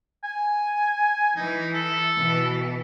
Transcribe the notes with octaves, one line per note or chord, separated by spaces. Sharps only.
G#5
E3 D#4
A4
B2 E3